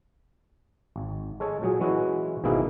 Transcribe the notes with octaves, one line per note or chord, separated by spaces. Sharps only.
G#1
G#3 A4 C#5
A#2 F#3 G#4
E3 G#3 C#4 E4 F#4
G#1 G#2 B2 A#3 E4 G#4